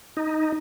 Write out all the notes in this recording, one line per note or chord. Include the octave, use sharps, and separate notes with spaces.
D#4